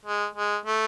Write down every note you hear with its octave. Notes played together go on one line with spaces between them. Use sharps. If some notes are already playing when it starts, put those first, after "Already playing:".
G#3
G#3
A3